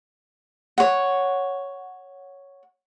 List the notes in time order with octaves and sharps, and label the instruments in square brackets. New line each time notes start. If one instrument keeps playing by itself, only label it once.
[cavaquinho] C#5 F#5